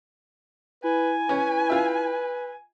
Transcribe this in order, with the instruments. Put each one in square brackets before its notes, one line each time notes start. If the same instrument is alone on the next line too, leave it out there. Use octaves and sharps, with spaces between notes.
[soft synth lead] E4 [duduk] B4 [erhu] G#5
[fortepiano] C#4 [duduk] B4
[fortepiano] F4 E5